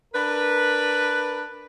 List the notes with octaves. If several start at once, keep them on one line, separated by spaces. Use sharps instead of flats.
D4 A#4 B4